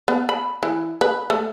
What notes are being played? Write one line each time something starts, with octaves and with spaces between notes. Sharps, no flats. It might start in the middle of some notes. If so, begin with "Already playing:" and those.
B3
B5
E3
B4
A3